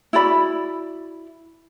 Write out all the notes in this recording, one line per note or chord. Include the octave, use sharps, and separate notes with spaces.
E4 F#4 D5 B5